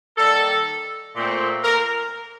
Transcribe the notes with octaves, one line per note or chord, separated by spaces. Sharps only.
D#3 G3 A#3 A4
A#2 A3 C4
A#4